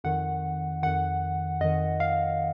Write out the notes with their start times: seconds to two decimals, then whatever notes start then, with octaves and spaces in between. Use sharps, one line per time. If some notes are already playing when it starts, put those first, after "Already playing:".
0.04 F2 D#3 F#5
0.83 F2 D#3 F#5
1.61 F2 D#3 D#5
2.00 F5